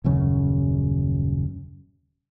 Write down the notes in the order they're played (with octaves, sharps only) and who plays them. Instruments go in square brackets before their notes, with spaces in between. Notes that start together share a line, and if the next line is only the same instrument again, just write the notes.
[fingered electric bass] D#1 F#2 C#3 C#4